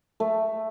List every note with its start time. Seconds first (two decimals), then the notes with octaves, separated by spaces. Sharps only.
0.20 A3